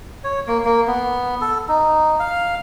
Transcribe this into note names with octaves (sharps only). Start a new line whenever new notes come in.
C#5
A#3
A#3
B3
A4
D#4
F5